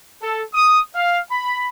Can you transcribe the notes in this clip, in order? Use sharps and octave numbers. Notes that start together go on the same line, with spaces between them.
A4
D#6
F5
B5